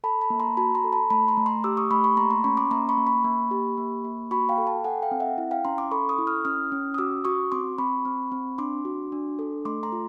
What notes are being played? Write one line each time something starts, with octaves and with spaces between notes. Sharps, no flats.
A4 A5 B5
A5 B5
A#3
A#5 C6
F#4 A5 B5
A#5 C6
A4
A5 B5
A3 A5 B5
A#5 C6
A3
A#5 C6
G4 D6 E6
C#6 D#6
A3 B5 C#6
B5 C#6
A#3 A#5 C6
A#5 C6
C#4 B5 C#6
C6 D6
A#3 A#5 C6
B5 C#6
A#3
B5 C#6
A#3
G4
A#3
A#3
F#4 B5 C#6
F5 G5
A4
G5 A5
A4 F#5 G#5
F5 G5
C4
E5 F#5
E4
F5 G5
C#4 A#5 C6
C6 D6
A4 B5 C#6
C#6 D#6
E4
D#6 F6
C#4 D#6 F6
C#4
D#6
F#4 D6 E6
F#4 C#6 D#6
C4 C6 D6
C4 B5 C#6
C4
C4
D4 C6 D6
F#4
D4
A4
A3 C6 D6
A#5 C6
F4